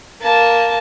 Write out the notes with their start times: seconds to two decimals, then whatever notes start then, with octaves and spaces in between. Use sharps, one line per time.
0.21 A#3 A5